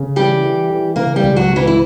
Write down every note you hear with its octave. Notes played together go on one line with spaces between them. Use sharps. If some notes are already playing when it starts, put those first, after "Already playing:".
Already playing: C#3
E3 G3 G4
E3
E3
C#3 A#3 A#4
G3 G4
C#2
F#3 F#4
C#2
E3 E4
E4